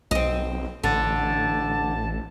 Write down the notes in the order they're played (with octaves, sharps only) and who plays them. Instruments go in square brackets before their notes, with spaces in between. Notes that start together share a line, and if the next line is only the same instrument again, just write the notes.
[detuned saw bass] B1 [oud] C4 D#5
[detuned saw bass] A1 [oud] D3 [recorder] A5